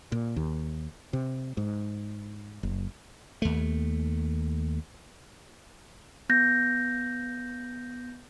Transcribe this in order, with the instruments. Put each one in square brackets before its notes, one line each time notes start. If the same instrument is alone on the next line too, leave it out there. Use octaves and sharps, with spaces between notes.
[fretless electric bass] A#2
D#2
C3
G#2
F#1
[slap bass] D#2 A3
[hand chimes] B3 G6 A#6